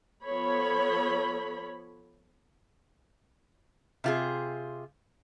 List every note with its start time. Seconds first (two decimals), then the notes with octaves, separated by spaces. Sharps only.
0.24 F3 B3 A4 C#5 B5
4.04 C3 F4 G#4